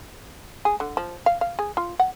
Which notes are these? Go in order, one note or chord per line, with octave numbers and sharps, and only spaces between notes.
G#4
D3
F3
F5
F5
G#4
F4
F#5